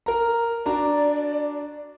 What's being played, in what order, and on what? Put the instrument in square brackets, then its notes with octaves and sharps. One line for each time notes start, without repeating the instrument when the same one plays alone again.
[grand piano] A#4 A#5
[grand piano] D4 F#4 A#5 [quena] D5